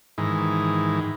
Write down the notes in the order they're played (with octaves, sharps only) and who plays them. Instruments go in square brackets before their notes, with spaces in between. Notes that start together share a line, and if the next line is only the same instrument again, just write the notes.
[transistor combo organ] G#2 D#3 E3